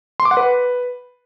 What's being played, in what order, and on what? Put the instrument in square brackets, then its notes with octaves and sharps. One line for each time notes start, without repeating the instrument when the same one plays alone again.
[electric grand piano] C6
D6
F#5
B4